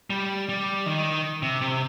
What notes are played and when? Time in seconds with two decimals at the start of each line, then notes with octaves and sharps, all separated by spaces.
0.10 G3
0.49 G3
0.86 D#3
1.42 C3
1.62 C3